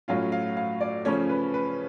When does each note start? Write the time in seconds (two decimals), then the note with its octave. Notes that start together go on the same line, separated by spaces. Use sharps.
0.08 A2 F#3 C#4 F4 F5
0.32 F5
0.57 F5
0.81 D5
1.05 C#3 F3 A3 C#4 C#5
1.29 B4
1.54 B4